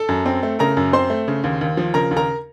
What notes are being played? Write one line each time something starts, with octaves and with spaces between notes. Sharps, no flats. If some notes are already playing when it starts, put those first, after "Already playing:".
Already playing: A4 A5
F#2
C4
A3
C#3 A#4 A#5
F#2
C4 C5 C6
A3
C#3
D#2
D#2
F3
C#3 A#4 A#5
D#2
A#4 A#5